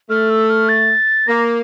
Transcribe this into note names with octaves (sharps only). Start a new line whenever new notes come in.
A3 F6
E6
F6
A6
A#3 A#6